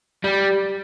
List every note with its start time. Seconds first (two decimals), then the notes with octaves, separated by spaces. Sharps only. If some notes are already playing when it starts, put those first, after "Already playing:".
0.24 G3